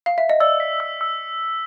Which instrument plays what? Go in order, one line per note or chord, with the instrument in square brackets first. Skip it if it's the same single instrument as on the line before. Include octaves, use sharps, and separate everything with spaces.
[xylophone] F5
E5
D#5
[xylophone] D5 [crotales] E6
[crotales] B6
E6
E6